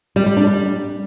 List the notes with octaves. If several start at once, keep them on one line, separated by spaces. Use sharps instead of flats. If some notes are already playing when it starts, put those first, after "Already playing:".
G3
G3
D4
G3